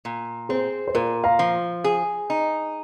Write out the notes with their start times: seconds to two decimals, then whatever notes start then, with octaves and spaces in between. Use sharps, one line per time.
0.05 A#2
0.49 C4 G#4 C5
0.88 C5
0.94 A#2 F4 A#4
1.24 F5 A#5
1.39 F3
1.84 G#4
2.30 D#4